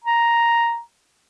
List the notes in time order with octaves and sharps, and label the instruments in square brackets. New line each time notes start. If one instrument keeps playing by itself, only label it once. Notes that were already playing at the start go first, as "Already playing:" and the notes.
[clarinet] A#5